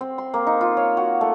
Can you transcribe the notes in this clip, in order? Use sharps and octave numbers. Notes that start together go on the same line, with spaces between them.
C4
C6
A#3
D#4
F4
C#5
F#4
A3